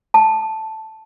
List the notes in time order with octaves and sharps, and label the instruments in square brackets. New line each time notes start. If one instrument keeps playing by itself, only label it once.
[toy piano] A5